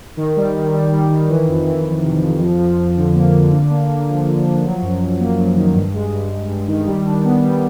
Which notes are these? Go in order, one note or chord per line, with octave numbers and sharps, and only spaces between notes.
D#3
G3
D#3
G3
G3
D#3
E3
F2
E3
E3
C3
F2
F3
F3
F3
D3
A#3
D3
D4
A#3
A#3
F3
D3
F3
F#3
F#2
F#2
A#3
F#2
D#3
G2
G#3
G2
G2
G2
D#3
G3
D4
B3
G3